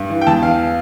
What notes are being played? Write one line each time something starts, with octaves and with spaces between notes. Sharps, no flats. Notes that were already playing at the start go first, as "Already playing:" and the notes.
Already playing: G2
E3
G5
E2 A5
E3 F5